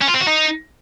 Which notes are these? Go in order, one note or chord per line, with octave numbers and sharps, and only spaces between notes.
C#4
F4
C4
F#4
D#4